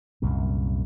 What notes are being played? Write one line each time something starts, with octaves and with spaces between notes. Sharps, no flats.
C2 F#2 A#2